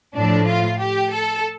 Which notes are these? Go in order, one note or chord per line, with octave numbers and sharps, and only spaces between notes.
A2 F3 A3 D4
F4
G4
A4